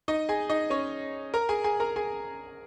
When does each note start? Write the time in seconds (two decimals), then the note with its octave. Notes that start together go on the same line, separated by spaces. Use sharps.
0.08 D#4 D#5
0.29 G#4 G#5
0.50 D#4 D#5
0.70 C#4 C#5
1.34 A#4 A#5
1.49 G#4 G#5
1.64 G#4 G#5
1.80 A#4 A#5
1.96 G#4 G#5